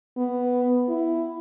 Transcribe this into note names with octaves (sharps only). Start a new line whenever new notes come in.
B3
E4